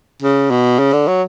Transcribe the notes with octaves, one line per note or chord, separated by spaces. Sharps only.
C#3
B2
C#3
D3
F#3